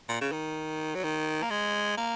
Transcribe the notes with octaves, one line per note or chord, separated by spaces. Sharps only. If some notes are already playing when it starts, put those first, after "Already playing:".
A#2
C#3
D#3
F#3
D#3
A#3
G#3
A#3